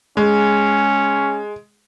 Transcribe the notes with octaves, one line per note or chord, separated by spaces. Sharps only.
G#3 C#4